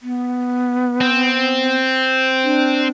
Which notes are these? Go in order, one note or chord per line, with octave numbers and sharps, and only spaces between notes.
B3
C4
D4